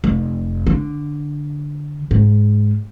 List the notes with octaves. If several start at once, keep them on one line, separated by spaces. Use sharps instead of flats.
F1
D3
G#2